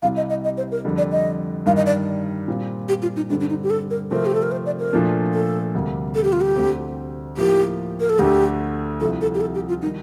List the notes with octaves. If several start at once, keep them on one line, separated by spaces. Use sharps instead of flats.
C2 C3 G3 F5
D#5
D#5
D#5
C5
A#4
F2 D3 G3
D5
D#5
G2 D#3 G3 F5
D#5
D5
A#2 G3 C4 F4
G4
F4
D#4
G2 D3 G3 C4 D4
D4
D#4
G4
A4
A#4
C3 F3 A3 C4 A#4
G4
A4
A#4
C5
D5
A#4
A#2 F3 A3 D4
A4
D2 C3 G3 A#3
A4
G4
F4
G4
D2 D3 A3 C4
A2 F3 A#3 G4
A#4
A4
D2 D3 A3 G4
C2 C3 F3 A4
A4
G4
A4
G4
F4
D#3 G3 D#4